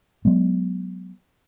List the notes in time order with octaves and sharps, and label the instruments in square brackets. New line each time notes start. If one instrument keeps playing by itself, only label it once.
[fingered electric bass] F#3 G#3 B3